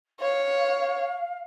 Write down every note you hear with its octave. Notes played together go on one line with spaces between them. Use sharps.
C#5 F5